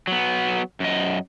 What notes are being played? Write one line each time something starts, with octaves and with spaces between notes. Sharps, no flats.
F#3 B3
F#2 D#5